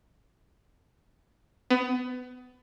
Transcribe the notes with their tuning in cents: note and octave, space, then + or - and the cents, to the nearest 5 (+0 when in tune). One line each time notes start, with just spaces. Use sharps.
B3 +30